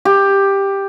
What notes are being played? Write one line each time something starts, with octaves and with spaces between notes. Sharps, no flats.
G4